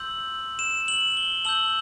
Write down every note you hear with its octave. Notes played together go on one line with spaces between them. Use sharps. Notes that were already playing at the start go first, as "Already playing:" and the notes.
Already playing: C6 E6 G6 F#7
E7
F#7
G7
A5 E6 G6 F#7